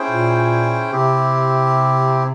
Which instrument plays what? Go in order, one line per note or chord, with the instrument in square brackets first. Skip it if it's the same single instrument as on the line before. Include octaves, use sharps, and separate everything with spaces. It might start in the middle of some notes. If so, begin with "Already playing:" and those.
Already playing: [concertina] C#4 E4 G#4 C5 G5
[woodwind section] A#2
[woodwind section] C3 [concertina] C4 E4 G4